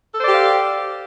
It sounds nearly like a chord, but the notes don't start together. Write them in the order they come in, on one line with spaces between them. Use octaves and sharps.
A4 C5 D5 G4 F5